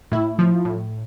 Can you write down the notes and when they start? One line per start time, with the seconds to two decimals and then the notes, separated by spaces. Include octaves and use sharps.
0.12 A2 E4
0.39 F3
0.65 A2